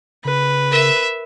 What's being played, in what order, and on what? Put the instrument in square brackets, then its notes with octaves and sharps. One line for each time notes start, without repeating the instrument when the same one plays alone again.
[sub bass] C#3 [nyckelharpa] B4
[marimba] A#4 [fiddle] E5